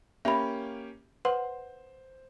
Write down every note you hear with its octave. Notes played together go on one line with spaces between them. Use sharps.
A#3 C#4 G4 E5 B5
B4 C5 F#5 C6